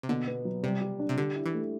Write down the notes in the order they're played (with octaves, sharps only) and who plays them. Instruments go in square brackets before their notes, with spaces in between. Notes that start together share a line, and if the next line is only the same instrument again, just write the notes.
[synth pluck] C3
[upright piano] B2 [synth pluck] D3
[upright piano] B3
F#3
[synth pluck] C3 [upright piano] G3
[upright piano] G4
D4
[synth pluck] C3
[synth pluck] D3 [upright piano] G4
[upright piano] E4
[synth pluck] E3
[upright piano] A3